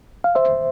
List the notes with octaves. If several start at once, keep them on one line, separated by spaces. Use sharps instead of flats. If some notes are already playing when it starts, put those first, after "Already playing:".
F5
C5 E5